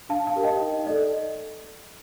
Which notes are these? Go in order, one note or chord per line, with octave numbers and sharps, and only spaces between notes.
D4 F5 A5
F5 A5
G4 A#4
D#5 G5
D#4
A4 D5 D#5